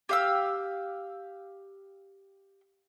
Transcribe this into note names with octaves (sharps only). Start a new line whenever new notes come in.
G4 F5 E6